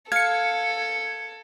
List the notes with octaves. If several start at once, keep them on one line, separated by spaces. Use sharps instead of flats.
A4 F5 G#6 C#7